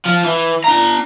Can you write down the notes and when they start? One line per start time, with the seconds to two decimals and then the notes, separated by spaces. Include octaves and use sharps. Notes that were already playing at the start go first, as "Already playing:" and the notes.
0.05 F3
0.24 E3
0.64 D4 A#5